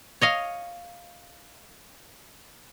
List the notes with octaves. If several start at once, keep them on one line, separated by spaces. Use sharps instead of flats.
C#5 D#5 F5